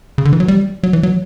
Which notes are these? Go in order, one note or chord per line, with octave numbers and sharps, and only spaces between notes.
C#3
D3
E3
F#3
G3
F#3
E3
F#3